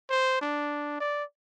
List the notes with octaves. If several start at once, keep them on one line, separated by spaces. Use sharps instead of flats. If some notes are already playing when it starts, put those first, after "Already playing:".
C5
D4
D5